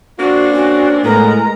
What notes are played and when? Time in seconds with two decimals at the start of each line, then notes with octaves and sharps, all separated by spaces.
0.19 A#3 C4 D4 F#4
0.55 C#4 F#4
1.04 A2 G#3 B3 A#4 A#5